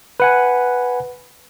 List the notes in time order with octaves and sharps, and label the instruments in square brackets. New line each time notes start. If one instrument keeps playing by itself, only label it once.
[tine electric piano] B4 F#5 G#5